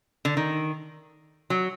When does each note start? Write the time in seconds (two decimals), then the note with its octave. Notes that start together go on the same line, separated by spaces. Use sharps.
0.25 D3
0.37 D#3
1.50 F#3